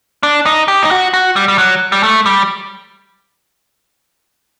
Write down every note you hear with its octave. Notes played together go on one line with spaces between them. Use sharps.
D4
D#4
G4
D#4
F#4
F#4
G3
G3
F#3
G3
A3
G3